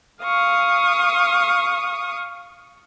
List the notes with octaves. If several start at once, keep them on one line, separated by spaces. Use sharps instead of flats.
F5 C#6 D#6